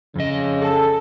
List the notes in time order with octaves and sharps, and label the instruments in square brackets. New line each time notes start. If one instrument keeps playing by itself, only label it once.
[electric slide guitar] F2 D#5 [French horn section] C#3
[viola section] A4